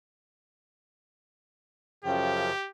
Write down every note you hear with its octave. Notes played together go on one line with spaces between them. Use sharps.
F#2 C#3 F3 G4 G5